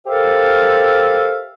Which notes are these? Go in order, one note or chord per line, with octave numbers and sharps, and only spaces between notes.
G4 A4 A#4 C5 E5 F5